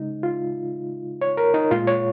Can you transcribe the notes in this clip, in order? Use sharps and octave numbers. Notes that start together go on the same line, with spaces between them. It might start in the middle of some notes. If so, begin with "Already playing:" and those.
Already playing: C#3 G#3 D#4
F4
C#5
A#4
D#4
A#2 G#3 F4
C#5